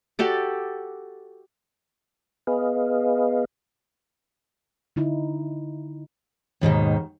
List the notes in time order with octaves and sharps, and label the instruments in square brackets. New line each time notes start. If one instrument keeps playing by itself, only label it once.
[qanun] F#4 G4 A4 D5
[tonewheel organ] B3 G#4 B4 D#5 F5
[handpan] D3 D#4 E4
[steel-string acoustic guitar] D#2 G#2 B2 D#3